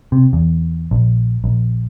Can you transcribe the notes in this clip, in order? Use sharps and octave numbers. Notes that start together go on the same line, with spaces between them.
C3
E2
A#1
A#1